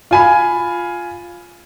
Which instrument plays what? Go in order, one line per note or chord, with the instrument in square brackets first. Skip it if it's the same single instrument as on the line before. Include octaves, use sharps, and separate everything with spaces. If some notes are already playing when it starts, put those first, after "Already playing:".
[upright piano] F4 G#5 B5